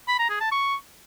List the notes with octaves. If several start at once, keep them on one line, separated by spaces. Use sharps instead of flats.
B5
A#5
G#4
A5
C#6